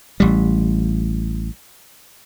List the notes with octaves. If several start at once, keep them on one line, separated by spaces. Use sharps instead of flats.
A1 G3